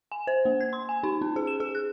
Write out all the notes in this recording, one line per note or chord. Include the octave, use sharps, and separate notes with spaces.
G#5
C5
A#3
G#6
C6
G#5
D#4
C#4
G#4
E7
G#4
F#6